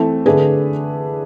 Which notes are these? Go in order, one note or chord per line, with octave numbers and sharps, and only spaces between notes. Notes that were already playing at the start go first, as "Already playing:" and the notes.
Already playing: E3 A3 C4
D3 A3 D4 G#4 B4